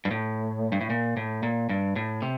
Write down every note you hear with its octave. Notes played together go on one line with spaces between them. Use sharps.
G2
A2
G2
A2
A#2
A2
A#2
G2
A2
C3